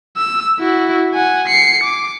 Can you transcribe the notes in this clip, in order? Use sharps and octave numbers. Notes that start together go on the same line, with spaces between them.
E6
E4 F#4
F#5 G#5
C7 C#7
D6